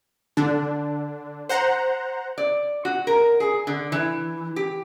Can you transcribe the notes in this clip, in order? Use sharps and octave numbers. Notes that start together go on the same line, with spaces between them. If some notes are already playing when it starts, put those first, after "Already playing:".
D3 D4
C5 F#5 A#5
D5
F#4
A#4
G#4
D3
E3
G4